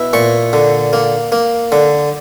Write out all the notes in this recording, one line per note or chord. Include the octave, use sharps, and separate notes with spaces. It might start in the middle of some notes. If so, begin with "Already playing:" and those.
Already playing: B2 E4
A#2 C#6
D3
A#3
A#3
D3